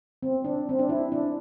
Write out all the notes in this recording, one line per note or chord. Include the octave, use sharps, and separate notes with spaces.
C4
D4
C4
D4
E4
D4